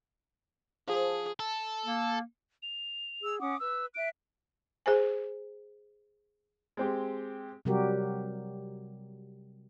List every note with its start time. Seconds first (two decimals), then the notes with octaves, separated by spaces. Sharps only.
0.88 F3 G#4
1.40 A4
1.86 A#3
2.63 F7
3.22 G#4 E6
3.40 C#4 F#5 D6 D#6
3.60 B4 E6
3.95 E5 F#6 D7
4.86 G#4 C5 G#5
6.77 G#3 C4 G4
7.65 C3 F#3 G3 F#4 G4 A#4